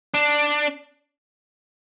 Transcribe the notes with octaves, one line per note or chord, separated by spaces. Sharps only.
D4